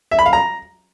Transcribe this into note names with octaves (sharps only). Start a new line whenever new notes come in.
E5
B5
F5
A#5